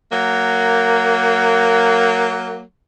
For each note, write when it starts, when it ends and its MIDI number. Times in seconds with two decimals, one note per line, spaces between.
0.11 2.61 54
0.11 2.61 58